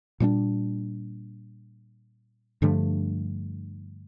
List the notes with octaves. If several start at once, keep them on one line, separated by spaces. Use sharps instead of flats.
A#2 G3 B3 D4
G2 D3 F3 A3